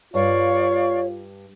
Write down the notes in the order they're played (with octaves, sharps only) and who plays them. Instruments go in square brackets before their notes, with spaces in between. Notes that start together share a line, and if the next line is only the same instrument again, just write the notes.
[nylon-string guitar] G2 [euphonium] F4 [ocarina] C#5 [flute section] D5 F5 C#6